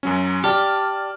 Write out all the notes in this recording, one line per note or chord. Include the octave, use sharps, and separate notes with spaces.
F#2 F#3 C#4
G4 D5 A5 F6